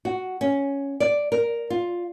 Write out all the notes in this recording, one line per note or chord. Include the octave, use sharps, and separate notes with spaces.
F#4
C#4
D5
A#4
F4